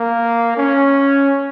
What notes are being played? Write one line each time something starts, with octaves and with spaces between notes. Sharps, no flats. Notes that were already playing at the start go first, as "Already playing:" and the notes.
Already playing: A#3
C#4